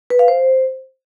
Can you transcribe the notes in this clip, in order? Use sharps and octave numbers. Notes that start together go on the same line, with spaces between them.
B4
F5
C5